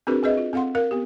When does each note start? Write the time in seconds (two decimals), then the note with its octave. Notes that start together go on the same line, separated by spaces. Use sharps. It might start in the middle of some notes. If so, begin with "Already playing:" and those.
0.07 C4 D4 F#4 G#4 A#4 B4
0.23 C4 G#4 B4 D#5 E5
0.37 F4
0.53 C4 A4 F5 F#5 C6
0.75 A#4 F5
0.91 B3 G4